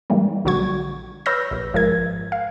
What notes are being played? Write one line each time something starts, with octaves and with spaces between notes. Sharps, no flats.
G#2 E3 G3 A#3
A#1 D3 F#3 F#4 C#6 G#6
B4 C#5 E6 F6 G6 A#6
A#1
G#1 F3 G#3 A#4 G#6
F5